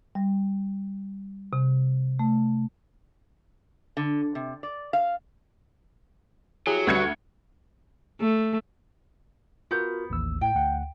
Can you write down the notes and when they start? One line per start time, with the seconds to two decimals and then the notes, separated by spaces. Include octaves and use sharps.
0.15 G3
1.53 C3
2.19 A3
3.97 D3
4.35 C3
4.63 D5
4.93 F5
6.67 F#3 E4 G4 G#4
6.87 D2 G3 B4 G#6 C#7
8.21 A3
9.71 B3 F4 F#4 A#4 G6
10.10 A1 D#2 E6
10.41 A2 G5
10.55 D2 F#5